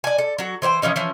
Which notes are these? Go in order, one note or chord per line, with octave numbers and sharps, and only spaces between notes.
D5 G#5
A4
F#3 F#4
E3 C5 C#5 G5
E3 F3 C#4 D#4
E3 F3 C#4